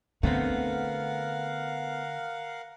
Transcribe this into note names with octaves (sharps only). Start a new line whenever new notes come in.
D3 A3 B3 C4 A#4 F5 F#5